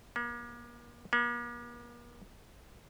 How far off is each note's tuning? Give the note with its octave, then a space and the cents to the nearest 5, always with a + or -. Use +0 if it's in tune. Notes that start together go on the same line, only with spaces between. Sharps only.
A#3 +40
A#3 +45